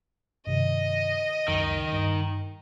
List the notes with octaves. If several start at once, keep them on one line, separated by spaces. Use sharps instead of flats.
G2 C3 D#3 D#5
C#2 F#2 D#3
G2